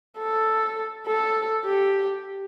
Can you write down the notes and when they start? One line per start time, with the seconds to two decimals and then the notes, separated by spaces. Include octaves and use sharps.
0.19 A4
1.07 A4
1.65 G4